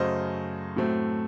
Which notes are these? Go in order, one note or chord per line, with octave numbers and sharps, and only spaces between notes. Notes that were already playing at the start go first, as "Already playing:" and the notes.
Already playing: F#2 C#3 F#3 A3 C5 D#5
A2 F#3 A3 C4